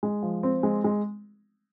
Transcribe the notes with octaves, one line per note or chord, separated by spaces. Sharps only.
G#3
F3
C4
G#3
G#3